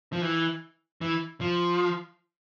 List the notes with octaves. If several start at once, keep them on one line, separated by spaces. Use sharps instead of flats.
F3
E3
E3
F3